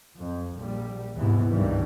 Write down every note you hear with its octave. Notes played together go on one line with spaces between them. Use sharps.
F2
A#1 G3
D#2 G#2 C3 E3 B3
C#2 G2 D#3 E3 G3